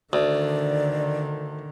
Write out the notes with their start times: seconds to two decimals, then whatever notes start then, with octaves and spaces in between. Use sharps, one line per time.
0.13 D2 D3 D#3 D5